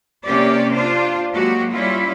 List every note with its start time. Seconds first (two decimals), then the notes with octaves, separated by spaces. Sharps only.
0.25 C3 A#3 C#4 G4 D5
0.73 D4 F4 C5
1.32 F#3 G#3 A#3 F#4 G4
1.72 G3 C#4 E4 F4